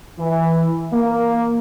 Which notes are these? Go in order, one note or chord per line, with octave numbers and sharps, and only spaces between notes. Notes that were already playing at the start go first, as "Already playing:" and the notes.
E3
A#3